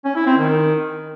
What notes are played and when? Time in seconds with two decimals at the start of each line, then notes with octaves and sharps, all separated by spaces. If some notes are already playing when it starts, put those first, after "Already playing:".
0.05 C#4
0.15 E4
0.26 C4
0.37 D#3